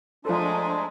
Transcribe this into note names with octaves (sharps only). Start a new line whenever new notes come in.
F3 G#3 A3 D4 A4 C5 A#5 C6